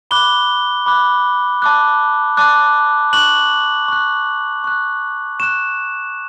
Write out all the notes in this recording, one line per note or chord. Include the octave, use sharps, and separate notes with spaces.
B5 D6 F#6 G7
B5 D6 F#6
A5 D6 F#6
A5 D6 F#6
C#6 F#6 F#7
C#6 F#6
C#6 F#6
C#6 F#6 E7